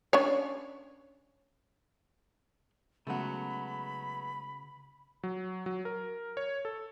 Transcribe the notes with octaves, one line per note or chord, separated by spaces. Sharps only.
C#4 D4 C#5
C#3 F#3 G#3 A3 B3 F#5 B5
F#3
F#3
A#4
C#5
A4